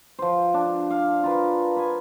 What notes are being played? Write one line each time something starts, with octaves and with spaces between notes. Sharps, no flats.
F3 C5
D4
F5
F4 A#4 B4
B4 G#5